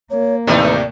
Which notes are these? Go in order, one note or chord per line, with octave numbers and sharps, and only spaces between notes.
A#3 C#5
D#2 A2 C3 E3 A3 D#4 D5